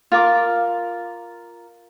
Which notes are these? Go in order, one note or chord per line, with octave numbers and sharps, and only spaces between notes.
F4 A#4 D6